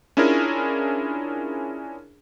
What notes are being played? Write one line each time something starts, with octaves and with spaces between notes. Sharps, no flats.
C#4 D4 E4 F4 G#4 A#4